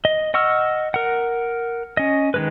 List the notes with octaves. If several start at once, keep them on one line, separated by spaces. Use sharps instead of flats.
D#5
D#5 F#5 C#6 E6 F6
A#4 F#5
C#4 D#5
D#3 G#3 B4